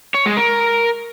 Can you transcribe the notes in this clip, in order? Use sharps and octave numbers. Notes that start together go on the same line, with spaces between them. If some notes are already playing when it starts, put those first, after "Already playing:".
C#5
G#3
A#4